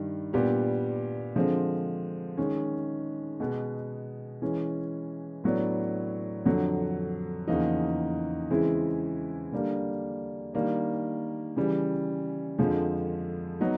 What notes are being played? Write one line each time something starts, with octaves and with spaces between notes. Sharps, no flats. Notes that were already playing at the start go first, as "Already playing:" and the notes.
Already playing: G2 D#3 G3
A#2 G3 B3 D4 G4
D3 F3 G#3 C4
D#3 G#3 C#4
B2 G#3 B3
E3 G#3 C#4
A2 F#3 B3 D4
F2 D3 F#3
E2 C#3 F3 A#3 D#4
C#3 E3 G#3 C4 E4
D3 G3 A#3 D4
D#3 G3 A#3 D4
C#3 E3 G3
F2 D3 F3 G#3
F#3 B3 D#4